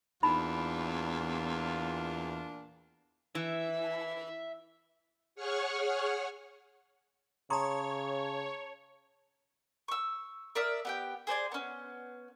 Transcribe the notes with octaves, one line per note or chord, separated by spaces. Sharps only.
E2 A#2 D4 D#4 F4 B5
E3 E5
G#4 C#5 F#5 C#6 F6
C#3 C#5 A5 A#5 C6 C#6 D#6
C#6 E6
A#4 D5 E5 D#6
B3 G4 G5
G#4 C5 D5 G#5
B3 C#4